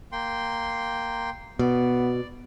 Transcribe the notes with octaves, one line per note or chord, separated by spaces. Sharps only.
A#3 G5 C6
B2 B3 D5